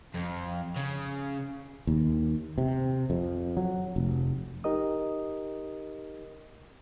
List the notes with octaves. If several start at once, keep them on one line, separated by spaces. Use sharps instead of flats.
F2
C#3
D#2
C3
F2
F#3
F1
D#4 G4 A#4 D#5 D#6